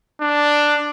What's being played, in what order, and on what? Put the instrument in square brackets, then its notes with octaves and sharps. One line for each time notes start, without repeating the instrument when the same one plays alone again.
[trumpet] D4